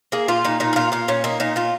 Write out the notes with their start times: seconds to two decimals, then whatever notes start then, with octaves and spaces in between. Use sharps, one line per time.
0.12 A#3 G#4
0.28 A#2 F4
0.44 A#2 D#4
0.60 A#2 D#4
0.73 G#4
0.76 A#2 F4
0.92 A#2 F4
1.08 A#2 C#4
1.24 A#3 D#4
1.40 A#2 D#4
1.56 A#2 F4